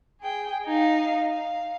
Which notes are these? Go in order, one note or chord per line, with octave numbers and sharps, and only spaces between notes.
G#4 G5
D#4 F5
F5